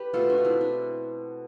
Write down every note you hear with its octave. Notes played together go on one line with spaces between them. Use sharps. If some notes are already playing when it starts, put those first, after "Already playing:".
Already playing: G4 B4
B2 A3 F4 A4
D4
F4
C4 E4
D4